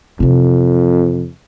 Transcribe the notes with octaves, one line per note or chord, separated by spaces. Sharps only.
F2 C3 E3